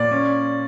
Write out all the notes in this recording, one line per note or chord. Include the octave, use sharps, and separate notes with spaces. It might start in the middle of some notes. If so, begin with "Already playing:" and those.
Already playing: A#2 D5
C#4